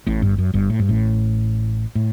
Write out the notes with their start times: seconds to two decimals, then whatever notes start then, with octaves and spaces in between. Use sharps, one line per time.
0.07 A1 A2
0.22 G1 G2
0.38 F#2
0.54 G1 G2
0.70 A2
0.79 G2
0.89 A1 A2
1.95 A2